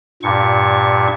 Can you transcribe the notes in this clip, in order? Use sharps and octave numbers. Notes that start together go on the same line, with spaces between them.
G2 A#2 C#6